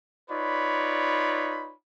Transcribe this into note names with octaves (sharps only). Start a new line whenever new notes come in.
D#4 F4 B4 C#5 D5 B5